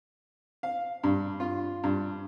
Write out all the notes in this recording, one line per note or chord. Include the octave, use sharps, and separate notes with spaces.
F5
G2
F4
G2